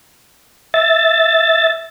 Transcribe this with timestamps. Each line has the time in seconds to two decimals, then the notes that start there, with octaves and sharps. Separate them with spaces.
0.74 E5 A6